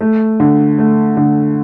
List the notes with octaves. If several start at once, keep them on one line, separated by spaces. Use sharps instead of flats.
A3
D3
A3
D3